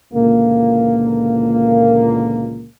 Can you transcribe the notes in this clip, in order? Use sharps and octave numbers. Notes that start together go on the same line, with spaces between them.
C#2 A#2 D3 E3 A#3